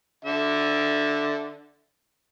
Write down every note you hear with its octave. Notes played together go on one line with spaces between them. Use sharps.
D3 E5